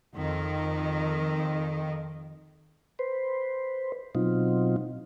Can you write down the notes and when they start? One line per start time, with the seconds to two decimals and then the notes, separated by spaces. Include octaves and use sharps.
0.15 F2 D#3
2.99 B4 C5
4.15 B2 F#3 C4 D#4 F4